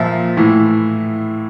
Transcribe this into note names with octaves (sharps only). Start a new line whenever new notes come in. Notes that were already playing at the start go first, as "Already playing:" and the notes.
Already playing: A#2 F3 E5
A2 E3